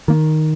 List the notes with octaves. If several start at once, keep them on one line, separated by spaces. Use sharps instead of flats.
D#3 A#3